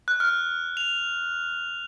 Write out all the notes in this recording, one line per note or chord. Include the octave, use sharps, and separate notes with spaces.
F#6
F6
F7